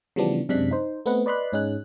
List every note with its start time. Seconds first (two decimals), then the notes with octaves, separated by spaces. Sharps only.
0.16 C#3 E3 F3 G3 B3 D4
0.49 F#2 C3 G#3 D4 F#6 B6
0.71 D#4 C5
1.06 A3 B3 C4 B4 D#5 F#5
1.26 B4 D5 D#5 B5 C6 F#6
1.53 G#2 C#4 D#4 G#4 F#6